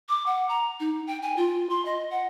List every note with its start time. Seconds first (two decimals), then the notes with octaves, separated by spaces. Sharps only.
0.09 D6
0.26 F#5
0.49 A#5
0.80 D#4
1.07 G5
1.22 G#5
1.37 F4
1.70 C6
1.85 D#5
2.11 F#5